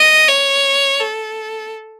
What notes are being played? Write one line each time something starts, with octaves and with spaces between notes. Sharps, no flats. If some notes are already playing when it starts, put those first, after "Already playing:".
Already playing: D#5
C#5
A4